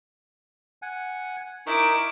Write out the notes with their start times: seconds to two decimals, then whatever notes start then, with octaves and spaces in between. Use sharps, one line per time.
0.82 F#5 G#5
1.67 D#4 E4 A#4 C#6 D6